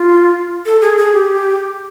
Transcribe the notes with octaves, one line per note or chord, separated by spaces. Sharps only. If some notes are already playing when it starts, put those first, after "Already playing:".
Already playing: F4
A4
G#4
G#4
G4